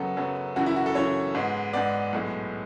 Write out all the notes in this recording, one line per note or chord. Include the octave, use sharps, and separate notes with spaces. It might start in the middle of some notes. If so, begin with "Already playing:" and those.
Already playing: F#2 C#3 F#3 B3 A4
F#2 C#3 F#3 B3
F#2 C#3 E3 F#4
E4
F#4
A4
F#2 C#3 E3 C#5
G#2 G#3 B3
G#2 G#3 B3 D5
B1 A2 G#3 B3